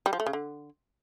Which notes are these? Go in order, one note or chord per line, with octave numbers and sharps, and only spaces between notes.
G3
F3
A3
C#3
D3